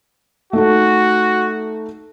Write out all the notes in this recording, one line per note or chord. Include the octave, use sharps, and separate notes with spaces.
A3 D#4 F#4 A4